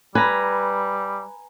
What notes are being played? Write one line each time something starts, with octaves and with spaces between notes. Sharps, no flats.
G3 B4 G#5 A#5